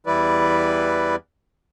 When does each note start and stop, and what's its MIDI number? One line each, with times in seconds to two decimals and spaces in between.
0.06 1.15 40
0.06 1.15 52
0.06 1.15 55
0.06 1.15 64
0.06 1.15 71
0.06 1.15 74